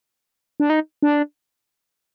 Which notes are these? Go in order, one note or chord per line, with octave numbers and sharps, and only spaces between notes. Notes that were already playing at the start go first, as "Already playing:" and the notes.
D4
D#4
D4